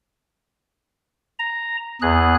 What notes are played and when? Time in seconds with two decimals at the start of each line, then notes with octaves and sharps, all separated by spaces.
1.39 A#5
2.02 E2 G#4 F#6